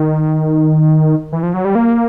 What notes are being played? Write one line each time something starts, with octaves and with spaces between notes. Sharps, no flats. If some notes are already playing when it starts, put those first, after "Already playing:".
Already playing: D#3
E3
F3
F#3
G3
A#3